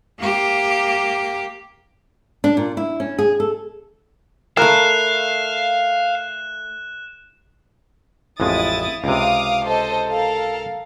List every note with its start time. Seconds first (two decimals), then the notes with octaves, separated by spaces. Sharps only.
0.19 A#3 G4
2.44 D4
2.57 A#2
2.77 E4
3.00 C#4
3.18 G#4
3.40 A4
4.57 A3 A#4 B4 F5 F#6 E7
8.40 A1 F2 G#3 E4 D#6 A6
9.04 C#2 C3 F5 D6 D#6
9.65 A4 C5 D#5
10.09 A4 A#4 F5